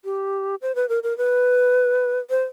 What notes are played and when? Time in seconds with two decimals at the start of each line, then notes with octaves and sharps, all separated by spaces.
0.05 G4
0.62 C5
0.75 B4
0.89 A#4
1.03 A#4
1.18 B4
2.30 C5